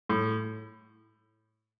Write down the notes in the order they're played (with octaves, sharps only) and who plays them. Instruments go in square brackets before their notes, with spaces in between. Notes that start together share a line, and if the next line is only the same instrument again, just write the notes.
[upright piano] A2